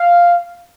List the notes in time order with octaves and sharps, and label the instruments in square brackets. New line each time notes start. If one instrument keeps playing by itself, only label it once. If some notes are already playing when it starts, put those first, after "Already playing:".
Already playing: [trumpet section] F5